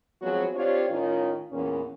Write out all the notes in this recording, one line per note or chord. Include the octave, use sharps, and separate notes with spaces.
F3 F#3 G#3 B3 C4 F#4
C4 D4 F4 G4 C#5
A2 D#3 C#4 D#4 F4
E2 A#2 C#4